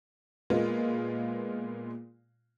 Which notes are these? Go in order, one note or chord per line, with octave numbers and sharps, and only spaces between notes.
A#2 G#3 A#3 B3 F4